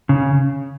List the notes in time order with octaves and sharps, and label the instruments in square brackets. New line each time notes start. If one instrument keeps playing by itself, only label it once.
[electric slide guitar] C#3